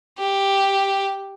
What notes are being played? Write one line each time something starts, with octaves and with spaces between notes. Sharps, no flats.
G4